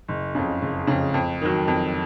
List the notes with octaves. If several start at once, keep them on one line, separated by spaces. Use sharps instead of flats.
F#1
F2 C#3
F#1
F2 C#3
F2
D#3 F#3
F2